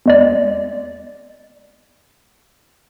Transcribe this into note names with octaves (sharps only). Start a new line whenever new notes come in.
E2 G#3 D5